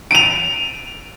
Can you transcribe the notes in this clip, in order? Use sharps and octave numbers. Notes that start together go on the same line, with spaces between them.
D7 D#7 F7